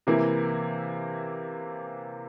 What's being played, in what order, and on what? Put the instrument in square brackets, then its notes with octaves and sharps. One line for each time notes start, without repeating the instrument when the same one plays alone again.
[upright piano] C3 E3 A#3 E4